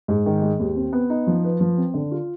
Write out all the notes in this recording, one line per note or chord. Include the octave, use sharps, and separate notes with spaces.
G#2
D#3
G#3
D#2
C4
B3
D#4
F3
B4
F3
C4
D3
F4